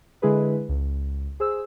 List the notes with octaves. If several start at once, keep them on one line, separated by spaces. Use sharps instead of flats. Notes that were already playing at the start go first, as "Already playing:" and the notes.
D3 G#3 E4 G#4 B4
C#2
G#4 C5 E6